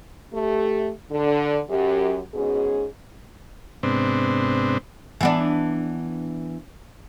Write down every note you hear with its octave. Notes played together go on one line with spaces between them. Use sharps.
A3 G4
D3
F#2 G4
G#2 B2 C#4 G#4
G#2 C3 B3 C4 D4
E3 B3 D4